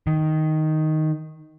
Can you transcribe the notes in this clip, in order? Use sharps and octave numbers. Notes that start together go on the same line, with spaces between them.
D#3